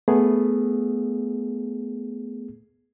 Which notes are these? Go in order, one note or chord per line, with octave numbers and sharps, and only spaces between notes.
A3 B3 G#4